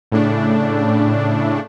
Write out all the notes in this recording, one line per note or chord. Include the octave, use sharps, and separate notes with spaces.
A2 C#3 A3 D4